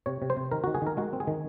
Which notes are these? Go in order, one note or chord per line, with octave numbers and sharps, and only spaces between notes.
C3 C#5
C3
C5
C3
D#3 A#4
D#3 F#4
G#4
D#3 A#4
G#3 F#4
C4
G#4
D#3